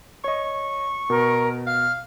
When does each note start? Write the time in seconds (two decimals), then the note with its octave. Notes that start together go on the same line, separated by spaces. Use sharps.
0.24 C#5 D#5 C#6
1.10 B2 A#4
1.67 F5 F6